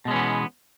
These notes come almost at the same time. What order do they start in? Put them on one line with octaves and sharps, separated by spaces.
B2 G#3 C#4 E3 B3